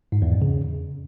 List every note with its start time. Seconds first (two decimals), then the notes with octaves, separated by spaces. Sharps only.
0.12 G#2
0.22 E2
0.32 F2
0.42 C#3